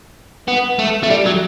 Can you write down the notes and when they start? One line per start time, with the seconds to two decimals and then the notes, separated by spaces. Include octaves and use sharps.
0.48 B3
0.79 A3
1.03 A3
1.10 G3
1.26 F#3